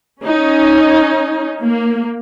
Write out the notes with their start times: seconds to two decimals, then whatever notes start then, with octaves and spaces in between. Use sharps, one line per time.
0.22 C#4 D#4
1.61 A#3